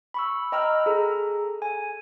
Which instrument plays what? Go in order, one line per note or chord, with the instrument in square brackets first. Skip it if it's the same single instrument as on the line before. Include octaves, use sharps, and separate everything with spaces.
[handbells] B5 C#6 E6
D#5 G5 A#5 B5 E6 F6
G#4 A4 A#5
G#5